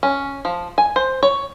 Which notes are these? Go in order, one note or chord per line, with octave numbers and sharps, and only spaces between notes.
C#4
F3
G#5
C5
C#5